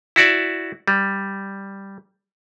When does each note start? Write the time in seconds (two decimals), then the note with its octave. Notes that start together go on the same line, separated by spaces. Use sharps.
0.16 E4 F#4 D5 E5
0.88 G3